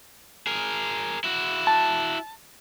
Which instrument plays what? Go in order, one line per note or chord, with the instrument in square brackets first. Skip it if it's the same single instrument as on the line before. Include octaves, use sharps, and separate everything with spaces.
[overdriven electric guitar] G#4 A#4
E4 F#4
[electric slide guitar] A5